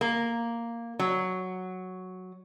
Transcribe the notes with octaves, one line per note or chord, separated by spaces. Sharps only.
A#3
F#3